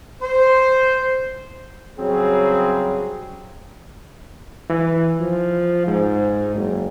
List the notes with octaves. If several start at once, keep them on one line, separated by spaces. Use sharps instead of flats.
C5
C#3 F#3 G3 C4 G#4
E3
F3
G#2
F#1